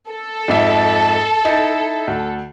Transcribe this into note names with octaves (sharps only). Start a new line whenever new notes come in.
A4
F2 G#2 E5
D#4 E4
D2